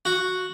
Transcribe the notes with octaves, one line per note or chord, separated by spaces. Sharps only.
F#4